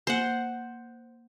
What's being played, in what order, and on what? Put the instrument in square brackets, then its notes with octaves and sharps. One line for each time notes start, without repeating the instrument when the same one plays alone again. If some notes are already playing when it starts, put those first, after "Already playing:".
[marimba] A#3 [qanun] C5 F#5